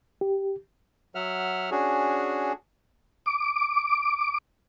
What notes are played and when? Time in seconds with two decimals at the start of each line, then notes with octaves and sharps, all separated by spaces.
0.21 G4
1.15 F#3 E5 F#5 F6
1.71 C#4 D4 F#4 G#4
3.26 D6